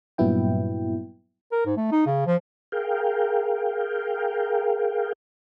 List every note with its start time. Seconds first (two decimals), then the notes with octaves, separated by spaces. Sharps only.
0.18 G2 A#2 F#3 B3 E4 G5
1.52 A#4
1.66 G#2
1.77 A3
1.92 D#4
2.06 C#3
2.26 F3
2.72 G#4 A#4 F5 G5